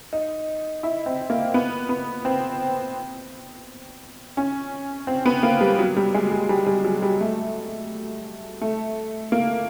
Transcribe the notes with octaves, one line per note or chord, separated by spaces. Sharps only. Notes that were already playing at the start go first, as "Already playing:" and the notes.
D#4
E4
C4
A#3
B3
B3
C4
C#4
C4
B3
A#3
G3
F#3
G3
G#3
G3
G3
G3
F#3
G3
A3
A3
A#3